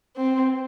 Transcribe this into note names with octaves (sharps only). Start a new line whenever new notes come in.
C4